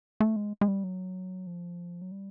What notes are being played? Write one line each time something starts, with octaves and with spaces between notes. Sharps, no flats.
A3
G#3
G#3
G3
F#3
F3
F#3
G3